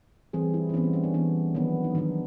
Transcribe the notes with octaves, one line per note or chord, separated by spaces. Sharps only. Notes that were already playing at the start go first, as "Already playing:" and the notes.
E3 G3 C4 G#4
E4
C4
E3 G3 B3 C#4
C4
C#4
D4
E3 G3 B3
D#3 F#3 B3
D#4
D#3 F#3 B3 D4